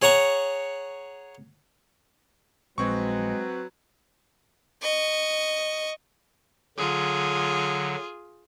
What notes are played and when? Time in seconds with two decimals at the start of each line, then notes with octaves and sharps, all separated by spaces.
0.02 G#4 C#5 F#5 A#5 C#6
2.78 A#1 F#3 G#3 C4 B4 C#6
4.82 D#5 C#6
6.78 D3 F#3 F4 G#4